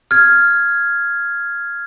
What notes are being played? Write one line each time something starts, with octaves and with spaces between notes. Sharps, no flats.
F6 G#6